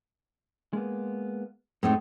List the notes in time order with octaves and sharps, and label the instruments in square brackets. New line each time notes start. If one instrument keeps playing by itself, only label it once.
[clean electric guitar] G#3 A#3 B3
[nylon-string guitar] A2 C4 D#4 [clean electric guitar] G#3